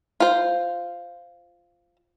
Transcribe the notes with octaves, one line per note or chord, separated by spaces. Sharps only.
F4 C5